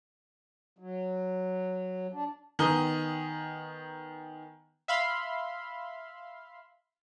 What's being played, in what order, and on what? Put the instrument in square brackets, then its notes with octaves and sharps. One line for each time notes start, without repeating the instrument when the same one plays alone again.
[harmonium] F#3
D4
[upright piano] D#3 B3 G#5 A#5 D#6 G7
[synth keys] E5 F5 B5 C6